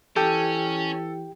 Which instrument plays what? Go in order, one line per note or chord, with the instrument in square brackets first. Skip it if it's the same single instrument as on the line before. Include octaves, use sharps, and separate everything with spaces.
[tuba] E3 [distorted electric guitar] C#4 [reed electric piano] G4 G5 [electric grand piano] A4